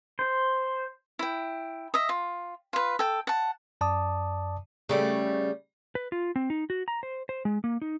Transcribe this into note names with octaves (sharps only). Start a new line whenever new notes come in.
C5
E4 G5
D#5 E5
F4
F4 B4
A4 G5
F#5 A5
F#2 D5 A5 D6 D#6
C#3 G3 A3
B4
F4
C4
D#4
F#4
A#5
C5
C5
G#3
A#3
D#4